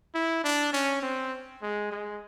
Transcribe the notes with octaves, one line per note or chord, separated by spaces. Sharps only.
E4
D4
C#4
C4
G#3
G#3